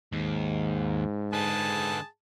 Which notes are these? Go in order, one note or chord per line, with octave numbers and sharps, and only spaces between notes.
D#2 G#2
D3 B3 G#4 A5